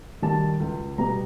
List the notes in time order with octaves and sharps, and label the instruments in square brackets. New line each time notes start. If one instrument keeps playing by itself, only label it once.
[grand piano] D#3 G3 A5
C#2
B2 G3 B3 A#5